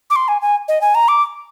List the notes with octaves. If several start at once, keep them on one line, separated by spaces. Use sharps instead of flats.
D6
C6
G#5
G#5
D#5
G#5
A#5
D6